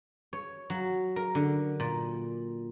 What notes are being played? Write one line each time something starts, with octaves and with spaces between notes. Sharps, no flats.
C#5
F#3
A#4
D3
A#2